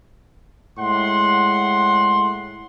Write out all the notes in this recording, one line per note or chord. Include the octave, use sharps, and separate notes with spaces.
A2 G#3 F#5 C6